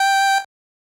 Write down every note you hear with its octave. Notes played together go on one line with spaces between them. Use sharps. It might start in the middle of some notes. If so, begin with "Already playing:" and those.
Already playing: G5